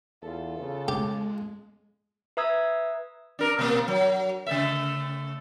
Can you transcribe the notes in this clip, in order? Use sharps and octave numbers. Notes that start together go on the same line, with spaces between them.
E2 F4 A4
C#3
G#3 G4
B4 E5 A#5 D#6 E6 G#6
D4 A#4
B2 A#3
F#3
C#3 A3 E5